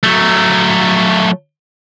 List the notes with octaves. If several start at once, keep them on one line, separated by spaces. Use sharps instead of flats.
F#3 A3